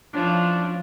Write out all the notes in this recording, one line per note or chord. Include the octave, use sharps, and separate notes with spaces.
E2 F3 C#4 D4